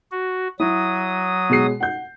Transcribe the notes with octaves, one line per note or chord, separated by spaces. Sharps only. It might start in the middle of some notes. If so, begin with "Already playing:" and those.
F#4
F#3 E4 D#6
B2 G#3 C7
F#5 G6